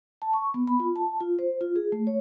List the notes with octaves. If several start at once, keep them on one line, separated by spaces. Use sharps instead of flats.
A5
C#6
B3
B5
F4
A5
F4
C5
F4
G#4
A3
C#5